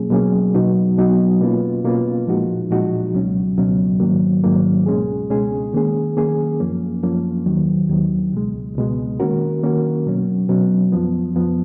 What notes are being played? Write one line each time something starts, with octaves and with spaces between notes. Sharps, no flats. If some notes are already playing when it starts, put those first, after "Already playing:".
Already playing: B2 F#3 A#3 C#4 G#4
B2 F#3 A#3 C#4 G#4
B2 F#3 B3 D#4 F#4
B2 F#3 B3 D#4 F#4
B2 A#3 C#4 F4 B4
B2 A#3 C#4 F4 B4
A#2 F3 G#3 D#4 F#4
A#2 F3 G#3 D#4 F#4
C#2 B2 F#3 C#4
C#2 B2 F#3 C#4
G#2 D#3 F#3 A#3
G#2 D#3 F#3 A#3
C#2 B2 G#3 C#4 G#4
C#2 B2 G#3 C#4 G#4
D#3 A#3 C#4 G#4
D#3 A#3 C#4 G#4
F#2 F3 A#3 C#4
F#2 F3 A#3 C#4
D#2 D#3 F#3
D#2 D#3 F#3
C#2 B2 G#3
C#2 B2 G#3
D#3 A#3 C#4 F#4 A#4
D#3 A#3 C#4 F#4 A#4
B2 F#3 C#4
B2 F#3 C#4
F2 F3 B3
F2 F3 B3